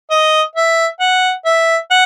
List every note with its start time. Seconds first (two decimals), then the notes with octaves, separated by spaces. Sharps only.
0.11 D#5
0.55 E5
1.00 F#5
1.46 E5
1.91 F#5